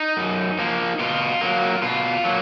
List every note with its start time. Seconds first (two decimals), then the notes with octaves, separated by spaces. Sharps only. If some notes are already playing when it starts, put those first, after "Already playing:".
Already playing: D#4
0.17 F#2
0.59 F3 A#3
0.99 B2 F4
1.41 F#3 A#3
1.83 B2 F4
2.24 F#3 A#3